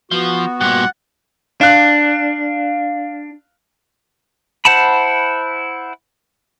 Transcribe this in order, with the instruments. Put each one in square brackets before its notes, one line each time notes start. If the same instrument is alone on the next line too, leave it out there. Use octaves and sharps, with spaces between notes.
[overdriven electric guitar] F3 [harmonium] B3 F#4
[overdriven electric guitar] G2 A#2 [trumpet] F#5
[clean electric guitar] D4 [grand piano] F5 F#6
[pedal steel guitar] E4 C5 F#5 A5 B5